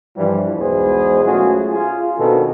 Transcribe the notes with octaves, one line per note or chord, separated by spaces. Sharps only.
G2 E3 F3 G3
B1 E2 G#3 B3 G#4 C5
F#3 A3 C#4 F4 F#4 G#4
F4 G#4
B2 D#3 C4 D4 A4